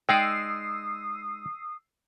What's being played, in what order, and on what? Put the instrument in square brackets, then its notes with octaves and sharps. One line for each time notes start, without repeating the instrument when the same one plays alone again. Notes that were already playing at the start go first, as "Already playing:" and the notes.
[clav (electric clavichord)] G#3 D#4 D5 [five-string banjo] G5 [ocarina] D#6 [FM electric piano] E6 C7